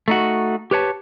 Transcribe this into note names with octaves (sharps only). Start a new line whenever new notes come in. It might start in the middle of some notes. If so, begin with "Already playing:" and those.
A3 D#4 F#4
G4 B4 C#5 A5